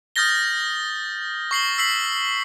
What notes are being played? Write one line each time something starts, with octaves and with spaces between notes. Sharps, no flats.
D#6 F6 G6 A6 A#6 G7
C#6 C7 F#7 G7
E6 B6 C7 F#7